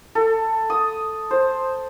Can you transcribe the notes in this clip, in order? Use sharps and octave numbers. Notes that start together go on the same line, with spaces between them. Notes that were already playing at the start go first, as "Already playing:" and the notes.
A4
D#6
C5